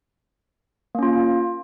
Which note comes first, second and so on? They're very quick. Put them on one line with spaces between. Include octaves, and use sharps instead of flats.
A#3 C#4 F4